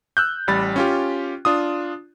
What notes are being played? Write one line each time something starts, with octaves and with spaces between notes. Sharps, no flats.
E6 F#6 G6
A1 G3 B5 A6
C#4 F4 G4
D4 F4 D#6